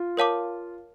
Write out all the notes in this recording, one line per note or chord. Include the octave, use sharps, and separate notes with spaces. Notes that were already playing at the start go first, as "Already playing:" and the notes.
Already playing: F4
A#4 C#5 F5 A5 D6